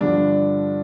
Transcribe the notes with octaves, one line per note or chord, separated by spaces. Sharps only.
G2 D3 F3 D4